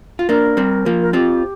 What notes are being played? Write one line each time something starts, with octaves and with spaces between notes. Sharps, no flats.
F4
A#3 D4 A#4
G3 C4
F3 A#3
A#4
C4 F4 G4